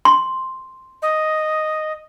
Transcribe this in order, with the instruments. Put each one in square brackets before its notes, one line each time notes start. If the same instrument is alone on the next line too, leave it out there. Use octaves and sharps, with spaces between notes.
[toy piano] C6
[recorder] D#5